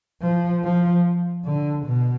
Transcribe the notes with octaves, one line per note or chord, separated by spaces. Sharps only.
F3
F3
D3
B2